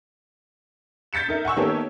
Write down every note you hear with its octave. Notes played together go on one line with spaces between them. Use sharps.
G6 A6 B6 C#7 E7
D#4 A#4 E5
F#5 G#5 C#6 E6
D#3 A#3 B3 G4 A4 C#5